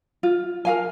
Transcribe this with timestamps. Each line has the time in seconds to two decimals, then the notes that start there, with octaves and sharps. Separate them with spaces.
0.23 F4
0.65 A#4 F5 G#5